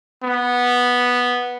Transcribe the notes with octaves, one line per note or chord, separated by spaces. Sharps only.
B3